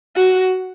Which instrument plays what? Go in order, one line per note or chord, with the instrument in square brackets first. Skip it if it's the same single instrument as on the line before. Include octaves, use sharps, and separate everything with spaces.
[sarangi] F#4